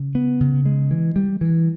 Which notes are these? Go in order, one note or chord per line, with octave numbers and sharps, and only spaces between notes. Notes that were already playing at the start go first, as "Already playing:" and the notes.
Already playing: C#3
B3
C#3
G#3
E3
G3
E3